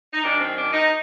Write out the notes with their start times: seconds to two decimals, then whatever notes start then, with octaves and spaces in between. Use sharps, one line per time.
0.13 D#4
0.23 F#2 D#3 D4
0.40 C4
0.56 D4
0.73 D#4